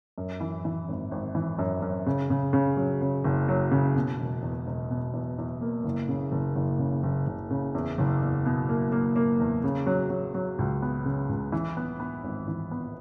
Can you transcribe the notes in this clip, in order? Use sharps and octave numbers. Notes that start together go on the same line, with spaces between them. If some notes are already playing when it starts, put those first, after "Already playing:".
F#2
E3
E3
G#1
G#1
E3
F#2
F#2
C#3
C#3
C#3
F#3
C#3
F#1
F#3
C#3
B2
E1
E2
E1
B2
E2
E2
A#3
F#1
C#3
F#1
F#1
C#3
F#1
F#1
C#3
E2
F#1
E2
B2
A#3
A#3
A#3
E2
C#3
F#3
F#3
F#3
C#2
B3
C#3
C#2
E3
B3
B3
G#1
E3
B3